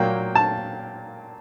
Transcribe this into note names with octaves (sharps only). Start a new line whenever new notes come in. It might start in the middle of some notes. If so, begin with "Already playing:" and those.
Already playing: A#2 F#3 A#3 G5
A5